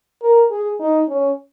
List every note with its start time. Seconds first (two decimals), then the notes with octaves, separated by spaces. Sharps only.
0.22 A#4
0.51 G#4
0.80 D#4
1.08 C#4